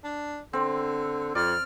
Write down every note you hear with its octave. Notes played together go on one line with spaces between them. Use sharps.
D4
D3 C4
F2 D5 F6